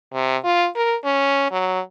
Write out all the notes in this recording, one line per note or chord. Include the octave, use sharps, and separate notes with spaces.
C3
F4
A#4
C#4
F#3